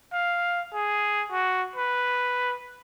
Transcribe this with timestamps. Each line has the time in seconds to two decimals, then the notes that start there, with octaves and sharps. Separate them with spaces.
0.13 F5
0.74 G#4
1.32 F#4
1.76 B4